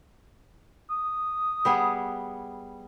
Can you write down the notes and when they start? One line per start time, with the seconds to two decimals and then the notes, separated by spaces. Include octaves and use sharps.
0.90 D#6
1.65 G3 B3 G#4